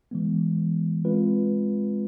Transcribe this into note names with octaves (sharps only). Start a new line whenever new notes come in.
E3 G#3 B3
G#3 C4 F4 B4